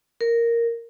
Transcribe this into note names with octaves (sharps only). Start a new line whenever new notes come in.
A#4